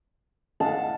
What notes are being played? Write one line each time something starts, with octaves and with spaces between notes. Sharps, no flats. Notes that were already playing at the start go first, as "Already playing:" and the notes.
D#5 F5 F#5 A5